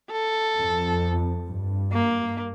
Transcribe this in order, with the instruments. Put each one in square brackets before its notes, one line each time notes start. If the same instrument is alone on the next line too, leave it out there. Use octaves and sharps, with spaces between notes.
[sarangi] A4
[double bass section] F2
G2
[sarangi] A#3